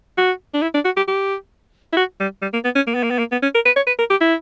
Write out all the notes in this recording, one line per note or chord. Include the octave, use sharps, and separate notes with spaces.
F#4
D4
E4
D4
F#4
G4
G4
E4
F#4
G3
G3
A#3
B3
C#4
A#3
B3
A#3
B3
A#3
B3
C#4
A#4
B4
C#5
B4
A#4
G4
E4